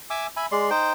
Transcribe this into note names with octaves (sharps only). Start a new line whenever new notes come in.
E5 G#5 D6 E6
E5 G#5 B5
G#3 D5 C6
D#4 C5 G5